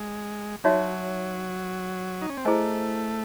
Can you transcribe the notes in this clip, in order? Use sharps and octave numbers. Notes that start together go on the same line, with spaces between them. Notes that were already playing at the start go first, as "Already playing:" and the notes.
Already playing: G#3
F#3 D#4 F#4 C#5 E5
D#4
C#4
C4
A3 E4 G#4 C5 D#5 G#5